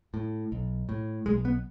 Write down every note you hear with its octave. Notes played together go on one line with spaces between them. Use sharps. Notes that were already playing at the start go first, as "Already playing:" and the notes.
A2
B1
A2
B1 G#3
B3